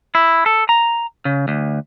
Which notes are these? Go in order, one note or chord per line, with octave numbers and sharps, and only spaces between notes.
E4
A4
A#5
C#3
D2